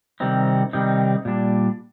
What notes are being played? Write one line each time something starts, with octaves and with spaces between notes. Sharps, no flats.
C3 D#3 G3 C4 D#4
C3 D#3 G3 C4 D#4
A#2 G3 D4